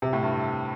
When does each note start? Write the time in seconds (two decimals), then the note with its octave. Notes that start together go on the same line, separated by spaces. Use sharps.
0.02 C3
0.13 A2
0.23 G2